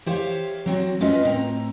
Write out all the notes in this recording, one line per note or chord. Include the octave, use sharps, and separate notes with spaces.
G4 C5 C#5 E5 F5
F#3 C4 F#4
B3 C#4 F4 B4 D#5 E5
A2 C4 A#5